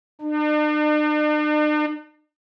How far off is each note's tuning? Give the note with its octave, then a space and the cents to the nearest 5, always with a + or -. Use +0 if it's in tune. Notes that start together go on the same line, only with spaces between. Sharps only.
D4 +45